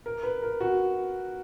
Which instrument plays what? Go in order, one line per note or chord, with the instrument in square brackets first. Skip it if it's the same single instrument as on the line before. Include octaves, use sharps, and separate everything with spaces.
[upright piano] A#4
B4
A#4
F#4